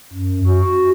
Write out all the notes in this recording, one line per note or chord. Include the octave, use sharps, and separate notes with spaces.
F#2
F#4